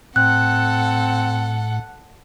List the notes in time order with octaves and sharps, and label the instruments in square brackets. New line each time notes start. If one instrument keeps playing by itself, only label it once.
[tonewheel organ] A2 [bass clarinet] C4 [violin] A4 F#5 [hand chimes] F#6